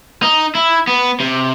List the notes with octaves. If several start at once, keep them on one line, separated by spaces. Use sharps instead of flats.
D#4
E4
B3
C3